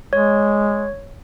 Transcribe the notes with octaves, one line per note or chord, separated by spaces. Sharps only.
G#3 C#5